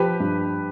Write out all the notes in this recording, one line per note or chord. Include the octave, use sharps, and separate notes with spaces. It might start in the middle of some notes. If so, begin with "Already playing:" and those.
Already playing: F3 G4 B4
G2